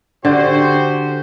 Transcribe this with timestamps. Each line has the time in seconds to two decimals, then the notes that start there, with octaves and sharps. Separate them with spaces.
0.25 D3 F#4 G4 C5